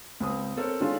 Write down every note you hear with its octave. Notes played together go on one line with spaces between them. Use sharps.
C#2 C4 D#6
C4 A4 A#4 C#5
D#3 G#3 C#4 D4 F4 A4